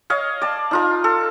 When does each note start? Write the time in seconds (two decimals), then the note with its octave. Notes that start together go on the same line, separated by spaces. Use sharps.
0.10 C#5 D#5 F5
0.41 D5 A5
0.71 D#4 F4 A#4
1.04 A4